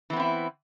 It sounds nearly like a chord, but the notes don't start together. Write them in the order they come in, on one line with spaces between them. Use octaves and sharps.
E3 B3 C4 E4